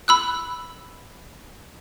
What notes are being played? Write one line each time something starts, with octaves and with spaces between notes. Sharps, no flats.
B5 E6 F#6